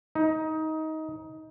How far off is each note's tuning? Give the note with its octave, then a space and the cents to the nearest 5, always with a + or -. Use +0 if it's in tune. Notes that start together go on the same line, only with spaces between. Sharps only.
D#4 +20